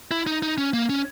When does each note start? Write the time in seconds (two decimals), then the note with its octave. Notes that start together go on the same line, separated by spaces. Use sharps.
0.11 E4
0.27 D#4
0.42 D#4
0.58 C#4
0.73 A#3
0.89 C#4